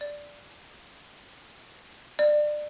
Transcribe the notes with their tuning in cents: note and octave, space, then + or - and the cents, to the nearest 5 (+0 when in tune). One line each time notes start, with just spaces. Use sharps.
D5 -5
D5 +25